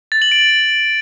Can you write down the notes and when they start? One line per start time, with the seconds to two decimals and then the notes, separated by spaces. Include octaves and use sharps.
0.12 A6
0.22 F#7
0.32 D7
0.41 F#7